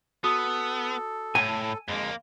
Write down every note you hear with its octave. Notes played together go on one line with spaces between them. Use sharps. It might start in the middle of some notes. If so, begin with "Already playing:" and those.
B3 F#4 A4 D#6
A2 G#5
F2 G#3 A#3